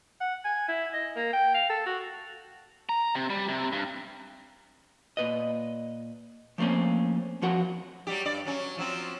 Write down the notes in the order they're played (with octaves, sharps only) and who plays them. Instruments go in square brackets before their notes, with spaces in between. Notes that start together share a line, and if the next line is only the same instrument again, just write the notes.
[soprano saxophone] F#5
G#5
E4
D#5
A#3
G5
F5
A4
F#4
[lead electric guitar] A#5
C3
G3
C3
G2
[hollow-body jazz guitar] A#2 B4 D#5
F3 A3 A#3 C4 C#4
F2 F3 F#4 A#4 F#5
[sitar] F#3 G3 G4
G2 D5
F#3 C#4
F3 F#3 C4